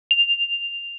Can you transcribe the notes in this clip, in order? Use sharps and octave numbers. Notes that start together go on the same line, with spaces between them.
F7